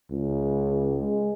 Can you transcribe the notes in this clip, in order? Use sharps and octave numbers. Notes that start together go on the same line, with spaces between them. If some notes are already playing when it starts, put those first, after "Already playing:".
C#2
G#3